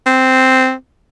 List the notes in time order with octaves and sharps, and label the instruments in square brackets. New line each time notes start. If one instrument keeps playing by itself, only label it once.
[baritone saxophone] C4